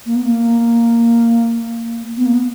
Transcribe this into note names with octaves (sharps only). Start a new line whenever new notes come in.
A#3
B3
A#3
B3
A#3
B3